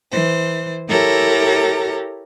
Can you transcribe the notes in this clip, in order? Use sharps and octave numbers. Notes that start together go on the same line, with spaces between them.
E3 C5
E4 G4 A4 A#4 C#5 A#5